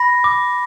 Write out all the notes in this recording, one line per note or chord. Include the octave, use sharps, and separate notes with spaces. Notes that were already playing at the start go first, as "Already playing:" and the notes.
Already playing: B5 A#6
D6